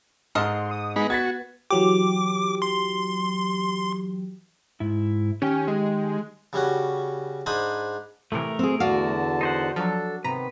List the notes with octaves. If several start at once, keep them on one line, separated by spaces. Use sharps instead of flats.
G#2 A4 A#4 D#5 C6
D#6
G#3 B3 D#4 B5
F#4 G#6 A6 B6
E3 F#3 G4 D6
C6
G#2 E4
D#3 C#4 G4 G5
G#3
C#3 G3 C#4 F#4
G#2 D4 C5 G#5 B5 D#6
A2 C3 E3 A3 A#4
C4 G#4
E2 D3 F#4 D5 F5 A5
D#4 C5 F#5
F3 F#3 D4 A4
C3 D#3 B3 C4 B4 A#5